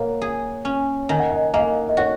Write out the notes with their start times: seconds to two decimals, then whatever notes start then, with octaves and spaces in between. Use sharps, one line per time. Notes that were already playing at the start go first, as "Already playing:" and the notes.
Already playing: A#2 A#3 C#5 F#5
0.22 G#4
0.65 C#4
1.09 D#3 G#5
1.20 F#5
1.31 D#5 G#5
1.54 A#3 D#5 G#5
1.89 D#5
1.97 F#4 C#5 F#5